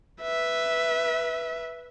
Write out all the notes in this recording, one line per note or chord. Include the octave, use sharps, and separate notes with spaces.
B4 E5